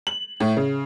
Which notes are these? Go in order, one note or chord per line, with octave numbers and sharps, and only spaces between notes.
F#7
A2
C#3